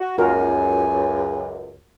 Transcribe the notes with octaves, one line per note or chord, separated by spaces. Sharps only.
F#4
C#2 F#2 F4 F#4 A#4 G#5